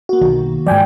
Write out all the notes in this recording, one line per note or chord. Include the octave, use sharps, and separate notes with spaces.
A#3 F#4
B1 D#3
G#2 F3 D5 G5 G#5